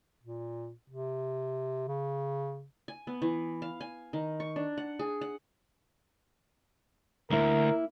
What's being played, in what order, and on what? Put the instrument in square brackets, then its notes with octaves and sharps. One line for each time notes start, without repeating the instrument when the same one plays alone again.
[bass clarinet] A#2
C3
C#3
[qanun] G#5
B3
E3
F5
G#5
D#3
C#6
D4
F#5
G#4
F#5
[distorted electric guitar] D2 [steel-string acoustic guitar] A#3 E4 [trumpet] A#4